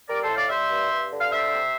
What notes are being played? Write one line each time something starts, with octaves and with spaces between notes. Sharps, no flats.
G3 A#4 D5
A4 C5
A2
D5 F5
G3 C5 E5
G2
G2
D3
F5
G3 C5 E5
C3